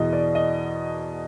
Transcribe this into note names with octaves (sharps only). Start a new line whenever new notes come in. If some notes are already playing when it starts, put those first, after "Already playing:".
Already playing: E2 B2 D#5
D5
D#5